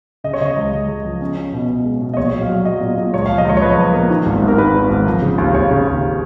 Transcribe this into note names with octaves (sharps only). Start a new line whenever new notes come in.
C#3 D#5
C#5
C#3 D#5
C#2
C#2
C#2
F3
C#4
C#4
B2
B2
G#3
B2
D#5
A#1 C#5
F#3
F5
F#3
F#3 D#5
A#2
A#2
C#2 C#5
F5
F3
D#5
C#2 C#5
C#5
F3 B4
F3
A#3
D#3
G#1
G#2
A#4
D#3 B4
G#1
G#1
F3
C#3
D#2
D#2 C#5
C#3
D#2